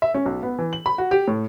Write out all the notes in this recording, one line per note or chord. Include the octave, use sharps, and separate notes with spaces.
E5
C#4
B1
B3
E3
F#7
B5
F#4
G4
A2